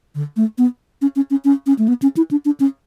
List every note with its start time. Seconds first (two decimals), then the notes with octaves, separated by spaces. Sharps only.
0.15 D3
0.36 A3
0.58 B3
1.02 C#4
1.16 C#4
1.30 C#4
1.45 C#4
1.67 C#4
1.78 A3
1.88 B3
2.02 C#4
2.17 E4
2.31 D4
2.45 D4
2.60 C#4